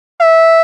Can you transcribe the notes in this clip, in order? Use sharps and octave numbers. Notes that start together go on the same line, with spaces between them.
E5